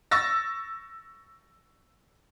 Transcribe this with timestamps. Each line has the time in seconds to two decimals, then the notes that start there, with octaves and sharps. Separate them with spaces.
0.11 C#6 E6 A6 A#6